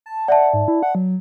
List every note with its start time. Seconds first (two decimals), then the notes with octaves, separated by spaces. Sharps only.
0.06 A5
0.28 D5 E5 F#5 A5
0.53 G#2
0.68 E4
0.83 F#5
0.95 F#3